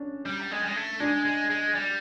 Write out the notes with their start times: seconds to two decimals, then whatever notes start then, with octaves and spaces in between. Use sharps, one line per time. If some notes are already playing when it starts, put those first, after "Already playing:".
Already playing: C#4 D4
0.26 G3
0.51 G#3
0.62 G3
0.68 G#3
0.76 A3
1.00 G#3 D4
1.25 G#3
1.50 G#3
1.75 G3